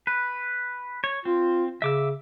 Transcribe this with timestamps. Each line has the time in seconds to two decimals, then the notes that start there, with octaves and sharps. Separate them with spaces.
0.07 B4
1.04 C#5
1.25 C4 F4
1.82 C#3 E5 D6 E6